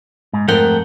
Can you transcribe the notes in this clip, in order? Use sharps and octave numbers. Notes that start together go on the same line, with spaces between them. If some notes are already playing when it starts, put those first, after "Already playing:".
G#2
F2 G#2 A3 A#4 F#5 G5